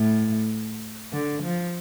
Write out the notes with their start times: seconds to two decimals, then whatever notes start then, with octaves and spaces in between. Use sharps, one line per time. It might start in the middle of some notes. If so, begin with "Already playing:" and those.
Already playing: A2
1.13 D3
1.43 F3